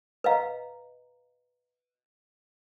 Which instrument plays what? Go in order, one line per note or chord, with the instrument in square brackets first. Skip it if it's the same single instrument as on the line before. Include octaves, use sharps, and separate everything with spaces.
[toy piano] B4 D#5 F5 A#5